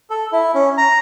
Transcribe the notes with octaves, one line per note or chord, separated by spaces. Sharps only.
A4
E4
C#4
A#5